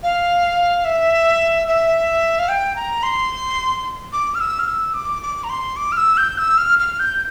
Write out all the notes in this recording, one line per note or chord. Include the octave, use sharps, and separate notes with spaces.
F5
E5
E5
F5
G5
A#5
C6
D6
F6
E6
F6
E6
D6
D6
A#5
C6
D6
F6
E6
G6
E6
F6
F6
G6